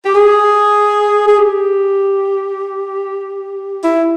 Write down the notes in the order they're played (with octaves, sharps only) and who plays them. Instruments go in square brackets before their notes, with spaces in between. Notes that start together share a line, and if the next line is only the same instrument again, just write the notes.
[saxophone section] G4
G#4
G#4
G4
E4